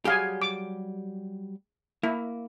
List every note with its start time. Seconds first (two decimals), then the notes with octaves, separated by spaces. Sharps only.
0.05 F#3 G3 G4 G#4 F5 G#5
0.42 D6
2.03 A#3 E4